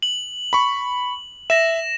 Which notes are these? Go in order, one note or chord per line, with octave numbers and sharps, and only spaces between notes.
F#7
B5 C#6
E5 A#6 E7